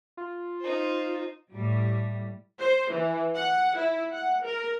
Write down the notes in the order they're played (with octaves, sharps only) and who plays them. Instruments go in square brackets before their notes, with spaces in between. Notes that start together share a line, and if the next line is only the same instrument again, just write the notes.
[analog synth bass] F4
[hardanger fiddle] D#4 C5
[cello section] A2 G3
[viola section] C5
E3
F#5
E4
F#5
A#4